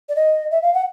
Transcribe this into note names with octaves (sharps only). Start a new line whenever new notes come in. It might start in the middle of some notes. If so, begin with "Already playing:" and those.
D5
D#5
E5
F5
F#5